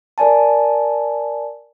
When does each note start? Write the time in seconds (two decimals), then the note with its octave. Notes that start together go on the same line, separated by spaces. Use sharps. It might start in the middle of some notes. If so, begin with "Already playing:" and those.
0.18 A#4 D5 G#5 A5